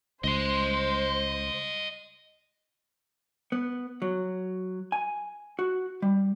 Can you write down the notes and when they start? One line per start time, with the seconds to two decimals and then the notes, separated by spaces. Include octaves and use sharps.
0.24 C#2 C5 D#5 C6
3.52 B3
4.02 F#3
4.92 G#5
5.59 F#4
6.02 G3